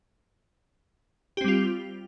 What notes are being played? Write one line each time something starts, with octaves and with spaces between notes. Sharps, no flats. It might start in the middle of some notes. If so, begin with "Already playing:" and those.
G3 C4 F4 G4